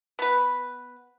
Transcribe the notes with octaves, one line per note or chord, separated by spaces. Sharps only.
B3 B4